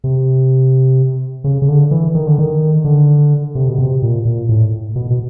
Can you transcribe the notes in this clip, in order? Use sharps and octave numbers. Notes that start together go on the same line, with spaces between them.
C3
C#3
C#3
D3
E3
D#3
D3
D#3
D3
C3
B2
C3
A#2
A#2
A2
B2
B2